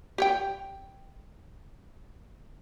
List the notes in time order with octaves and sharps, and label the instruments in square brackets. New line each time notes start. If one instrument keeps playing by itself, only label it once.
[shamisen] G4 C#5 G5